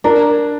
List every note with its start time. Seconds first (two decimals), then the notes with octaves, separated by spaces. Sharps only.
0.04 D4 A#4